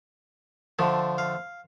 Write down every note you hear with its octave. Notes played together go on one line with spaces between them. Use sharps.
D3 F3 A3 E5
F5